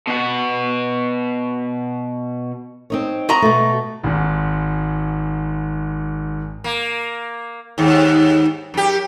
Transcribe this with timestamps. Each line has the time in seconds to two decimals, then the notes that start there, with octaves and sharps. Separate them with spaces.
0.07 B2 F#4
2.90 C4 D#4 C#5
3.29 F#4 D#5 A#5
3.42 B2 A3
4.03 G#1 G#2
6.64 A#3
7.78 D#2 G#2
8.74 F#2 G4